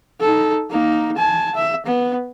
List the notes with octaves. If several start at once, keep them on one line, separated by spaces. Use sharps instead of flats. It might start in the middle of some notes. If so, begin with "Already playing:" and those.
D#4 A4
A#3 D#4
G#5 A5
E5
B3